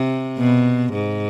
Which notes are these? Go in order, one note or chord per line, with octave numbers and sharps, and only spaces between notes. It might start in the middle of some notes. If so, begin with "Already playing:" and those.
Already playing: C3
B2
G#2